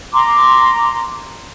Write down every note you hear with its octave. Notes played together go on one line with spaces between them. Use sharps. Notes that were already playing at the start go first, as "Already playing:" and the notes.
A#5 C6 D6